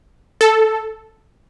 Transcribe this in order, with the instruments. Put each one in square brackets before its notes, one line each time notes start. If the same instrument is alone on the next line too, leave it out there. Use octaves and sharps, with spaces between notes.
[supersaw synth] A4